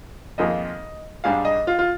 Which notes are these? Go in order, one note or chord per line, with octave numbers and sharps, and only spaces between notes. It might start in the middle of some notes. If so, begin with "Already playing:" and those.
F2 D#3 A#3 F4 G#4 D#5
G#2 G3 D4 G#4 F5
D#5
F4
F4